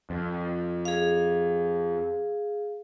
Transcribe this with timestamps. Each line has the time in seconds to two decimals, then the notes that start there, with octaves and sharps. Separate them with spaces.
0.10 F2
0.85 G#4 F5